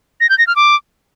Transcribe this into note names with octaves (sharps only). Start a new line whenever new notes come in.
A#6
G6
A#6
F6
D6